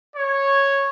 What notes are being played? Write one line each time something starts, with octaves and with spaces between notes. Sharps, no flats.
C#5